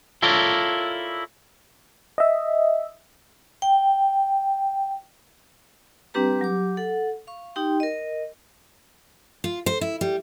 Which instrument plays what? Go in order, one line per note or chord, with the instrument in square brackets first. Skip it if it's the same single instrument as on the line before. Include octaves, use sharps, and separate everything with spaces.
[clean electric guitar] E4 F4 A4 A#4 C#5 D5
[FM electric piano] D#5 E5
[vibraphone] G5
G3 C4 D4 G4 B4 A#5
F#3 G4 D6
A4 F#5
F5 C#6
D#4 G4 G5 C6
A#4 D#5
[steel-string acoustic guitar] F4
C5
E4
G3